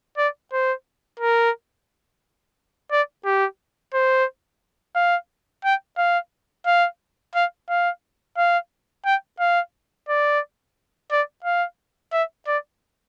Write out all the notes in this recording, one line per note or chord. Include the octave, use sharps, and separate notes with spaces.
D5
C5
A#4
D5
G4
C5
F5
G5
F5
F5
F5
F5
F5
G5
F5
D5
D5
F5
E5
D5